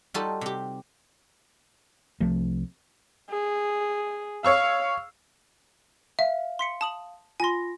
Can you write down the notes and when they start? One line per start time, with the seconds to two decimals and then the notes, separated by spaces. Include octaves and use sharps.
0.14 G3 D#4 F4 F#4 A4
0.41 C3 G4
2.20 C2 F3 A3
3.30 G#4
4.45 C#5 F5 C#6 E6
6.19 E5 F5
6.59 C6 B6 C#7
6.81 A5 D#6 F#7
7.40 F4 G#5 C6 A#6